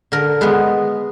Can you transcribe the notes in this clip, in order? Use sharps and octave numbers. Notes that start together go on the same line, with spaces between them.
D3 A#4
G#3 B3 B4